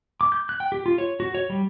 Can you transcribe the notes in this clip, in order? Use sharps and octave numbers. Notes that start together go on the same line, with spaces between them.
D6
G6
F#6
G5
G4
F4
C#5
F#4
C#5
G3